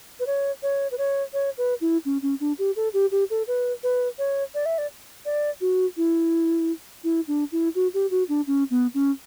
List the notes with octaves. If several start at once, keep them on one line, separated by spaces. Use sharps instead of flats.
B4
C#5
C#5
B4
C#5
C#5
B4
E4
C#4
C#4
D4
G4
A4
G4
G4
A4
B4
B4
C#5
D5
E5
D5
D5
F#4
E4
E4
D4
E4
F#4
G4
F#4
D4
C#4
B3
C#4